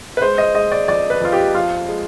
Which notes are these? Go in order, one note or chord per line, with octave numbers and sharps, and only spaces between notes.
B4
G#3 C5
D#5
G#3 D#5
D5
F2 D5
B4
F2 F4
G4
F3 F4
G#3